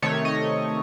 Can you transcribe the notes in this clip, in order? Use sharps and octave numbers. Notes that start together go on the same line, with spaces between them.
C3 D#3 A3 C#5
D#5